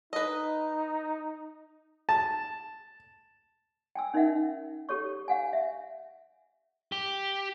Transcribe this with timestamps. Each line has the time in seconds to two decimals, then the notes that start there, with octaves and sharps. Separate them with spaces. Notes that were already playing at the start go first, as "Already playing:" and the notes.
0.13 D#4 B4 D#5
2.09 A5
3.95 G5 G#5 E6
4.14 C#4 D#4 A#4 D#5 E5 F#5
4.89 G4 A4 C#5 C#6
5.28 F5 F#5 G#5
5.53 E5
6.92 G4